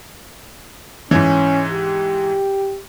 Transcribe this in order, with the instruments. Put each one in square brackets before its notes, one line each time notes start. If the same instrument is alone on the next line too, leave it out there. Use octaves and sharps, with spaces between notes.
[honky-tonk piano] G#2 E3 [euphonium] C#4
[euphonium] G4